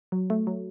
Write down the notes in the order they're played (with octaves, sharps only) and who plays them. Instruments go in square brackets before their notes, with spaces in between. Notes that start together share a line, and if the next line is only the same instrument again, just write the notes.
[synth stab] F#3
A3
F#3